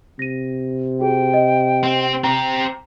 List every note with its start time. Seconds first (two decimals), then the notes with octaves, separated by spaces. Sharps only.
0.19 C3 A#6 D#7
1.00 F#4 G#4 C5 G5
1.34 D#5
1.83 C4
2.24 C4 G4 G5 A#5